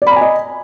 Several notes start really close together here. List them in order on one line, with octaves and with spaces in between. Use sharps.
D5 B5 A#5 G#5 D#5